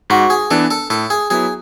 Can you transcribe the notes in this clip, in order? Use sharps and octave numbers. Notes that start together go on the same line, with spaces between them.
G#2 F#4
G#4
E3 B3 D4 A4
A4
A2 A4
G#4
F#3 B3 E4 G#4